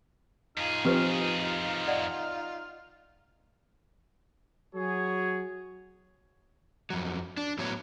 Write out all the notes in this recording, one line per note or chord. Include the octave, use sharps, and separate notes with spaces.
F2 D#4 F4 G#4 F6
F3 C4 G4 B4
D5 D#5 F#5
F#3 F#4 G#4 C#5
F2 F#3
D4
A2 F#3 B3 C#5